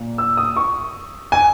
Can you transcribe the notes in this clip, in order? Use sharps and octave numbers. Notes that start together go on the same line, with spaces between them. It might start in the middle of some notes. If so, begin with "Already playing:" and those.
Already playing: A#2 A#3
E6
D#6
C#6
G#5